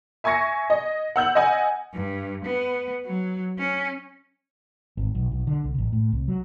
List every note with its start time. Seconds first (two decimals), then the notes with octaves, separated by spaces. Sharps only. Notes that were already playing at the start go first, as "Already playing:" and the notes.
0.24 E5 G#5 C#6 G#6 A#6 C#7
0.70 D#5
1.16 F#5 E6 G6 F#7
1.35 D#5 F#5 G#5
1.94 G2
2.46 B3
3.06 F#3
3.58 C#4
4.97 G#1
5.15 B1
5.31 B1
5.47 D3
5.64 C2
5.78 A1
5.93 A2
6.12 C2
6.28 F#3